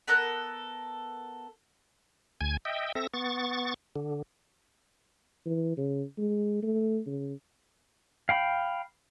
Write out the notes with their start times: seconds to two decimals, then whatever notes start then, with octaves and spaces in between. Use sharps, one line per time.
0.07 B3 A4 A#4 F#6
2.41 D2 G#5 G#6
2.65 D#5 E5 G5
2.95 C4 A4 E5 A#6
3.14 B3 C#6 A6
3.96 D3
5.46 E3
5.78 C#3
6.18 G#3
6.63 A3
7.07 C#3
8.29 F5 G5 B5